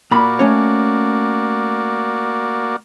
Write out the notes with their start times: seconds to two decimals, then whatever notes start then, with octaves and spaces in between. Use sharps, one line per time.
0.11 A#2 A#3 F#4 D5 B5
0.39 A3 C#4 C#5